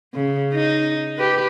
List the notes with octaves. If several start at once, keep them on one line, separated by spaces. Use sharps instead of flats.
C#3
D#4
G4 B4